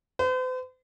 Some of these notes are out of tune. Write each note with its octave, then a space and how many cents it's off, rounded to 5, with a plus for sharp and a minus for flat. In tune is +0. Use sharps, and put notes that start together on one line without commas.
C5 -45